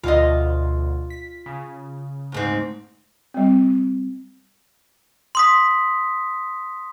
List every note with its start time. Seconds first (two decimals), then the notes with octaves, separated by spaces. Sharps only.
0.04 D2 B2 D3 F4 D#5
1.10 B6
1.46 C#3
2.32 D2 G#2 C4
3.34 G3 C4
5.35 C6 D#6 B6